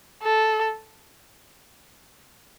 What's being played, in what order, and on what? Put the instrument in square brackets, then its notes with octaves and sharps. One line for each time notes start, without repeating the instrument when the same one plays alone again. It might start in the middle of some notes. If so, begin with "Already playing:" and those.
[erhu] A4